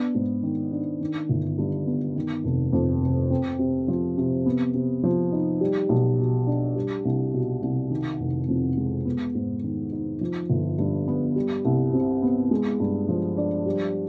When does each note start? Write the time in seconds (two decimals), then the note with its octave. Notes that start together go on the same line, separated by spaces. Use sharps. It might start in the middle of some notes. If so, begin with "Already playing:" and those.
Already playing: B3 D4
0.15 G#2
0.43 D#3
0.72 D4
1.01 D#3
1.29 G1
1.58 G2
1.87 B3
2.16 D#3
2.44 F1
2.73 F2
3.02 F1
3.30 C4
3.59 C3
3.88 F3
4.17 C3
4.46 B3
4.74 C3
5.03 F3
5.32 D#4
5.61 G3
5.89 B1
6.18 B2
6.47 D4
6.76 G3
7.05 C2
7.33 B2
7.62 C2
7.91 D#3
8.20 F1
8.48 F2
8.77 G#3
9.05 B3
9.35 G#2
9.64 D#3
9.92 D#4
10.21 F3
10.50 G1
10.79 G2
11.08 B3
11.36 G3
11.65 C2
11.93 C3
12.22 B3
12.51 G#3
12.80 G2
13.09 F3
13.37 D4
13.66 G3